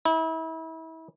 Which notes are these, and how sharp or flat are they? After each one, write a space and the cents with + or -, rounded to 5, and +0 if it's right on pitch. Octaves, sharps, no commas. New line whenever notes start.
E4 -35